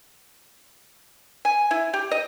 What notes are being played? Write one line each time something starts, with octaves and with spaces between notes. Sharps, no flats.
G#5
E4
G4
D#5